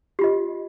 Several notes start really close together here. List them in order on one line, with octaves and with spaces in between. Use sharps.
G4 F4 D#5